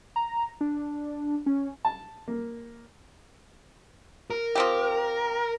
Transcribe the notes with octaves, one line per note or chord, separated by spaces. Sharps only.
A#5
D4
C#4
A5
A#3
A#4
F3 C4 G4